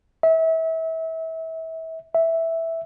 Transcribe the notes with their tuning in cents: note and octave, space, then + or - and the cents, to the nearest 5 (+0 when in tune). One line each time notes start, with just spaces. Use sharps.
E5 -30
E5 -5